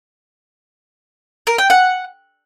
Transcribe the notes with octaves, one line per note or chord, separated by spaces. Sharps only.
A#4
G5
F#5